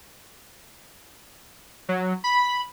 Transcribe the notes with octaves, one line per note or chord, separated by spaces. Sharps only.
F#3
B5